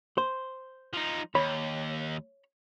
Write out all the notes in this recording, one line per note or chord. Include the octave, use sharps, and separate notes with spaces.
C5
F3 D#4
D#2 C#5 B5